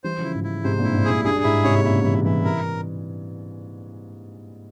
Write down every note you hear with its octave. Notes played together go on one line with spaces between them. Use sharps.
E3 G3 C5
C#3 F3
E4
G#2
E4
G#2 C3 C5
G2 A#2
E4
G#2
G#4
G#2
G2 G#4
G2
G#2 E4
G#2 C3 C#5
A#2 C#3 E4
C3 E3 E4
E3 G3 E4
C3 E3 A#4